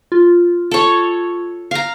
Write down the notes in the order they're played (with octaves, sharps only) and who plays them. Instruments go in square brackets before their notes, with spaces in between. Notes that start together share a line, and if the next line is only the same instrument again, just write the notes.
[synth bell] F4
[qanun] A4 C#5
F5 A#5